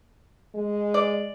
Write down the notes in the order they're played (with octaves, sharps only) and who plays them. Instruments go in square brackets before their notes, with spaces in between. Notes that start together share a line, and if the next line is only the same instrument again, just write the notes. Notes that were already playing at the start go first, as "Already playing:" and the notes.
[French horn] G#3
[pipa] D5